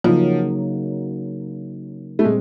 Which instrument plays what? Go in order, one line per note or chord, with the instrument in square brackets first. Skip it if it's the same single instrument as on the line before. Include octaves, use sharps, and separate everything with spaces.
[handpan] C#3 F#3 A#3 D#4 [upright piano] F3
[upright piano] A3
[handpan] A#2 G3 C4 [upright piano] G#3